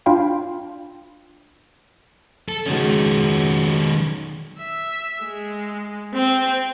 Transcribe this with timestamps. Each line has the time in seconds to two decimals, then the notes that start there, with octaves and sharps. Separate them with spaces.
0.06 D4 F4 F5 G5 B5 C6
2.49 A4
2.66 C#2 B2 D#3 C#4 C#6
4.60 E5
5.23 G#3
6.13 C4